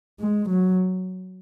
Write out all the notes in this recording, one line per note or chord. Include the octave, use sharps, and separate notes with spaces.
G#3
F#3